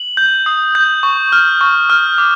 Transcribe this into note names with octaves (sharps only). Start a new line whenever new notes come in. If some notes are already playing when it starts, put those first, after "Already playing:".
Already playing: F#7
G6
D#6
G6
C#6
F6
C#6
F6
D6